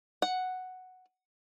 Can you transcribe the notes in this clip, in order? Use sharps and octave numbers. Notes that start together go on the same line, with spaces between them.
F#5